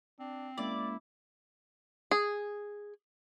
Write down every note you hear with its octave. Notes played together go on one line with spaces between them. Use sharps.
C4 D4
G#3 A#3 C#4 E4 D5
G#4